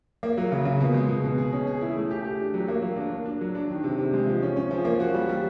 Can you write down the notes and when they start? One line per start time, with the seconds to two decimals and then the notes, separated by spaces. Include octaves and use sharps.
0.23 A#3
0.37 F#3
0.52 C#3
0.65 C#3
0.80 B2
0.94 G#3
1.09 B2
1.24 B2
1.38 G#4
1.53 C#4
1.67 G#4
1.81 E4
1.96 A3
2.11 G4
2.25 G4
2.39 D4
2.54 F#3
2.68 A#3
2.82 F#3
2.97 D4
3.11 D4
3.26 D4
3.41 F#3
3.55 D4
3.70 D#3
3.84 C3
3.98 C3
4.14 G#3
4.27 F3
4.42 C#4
4.56 C#4
4.71 F3
4.85 A#3
5.00 F#4
5.14 G3
5.29 G3